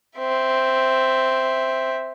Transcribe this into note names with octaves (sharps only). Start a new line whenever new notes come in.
C4 E5